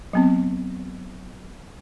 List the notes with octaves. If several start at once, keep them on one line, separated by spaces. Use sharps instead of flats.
F#3 B3 C4